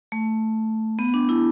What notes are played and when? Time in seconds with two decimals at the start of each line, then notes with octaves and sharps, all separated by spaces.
0.12 A3
0.99 B3
1.14 D4
1.29 E4